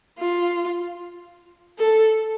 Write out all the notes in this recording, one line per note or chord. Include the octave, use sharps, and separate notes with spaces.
F4
A4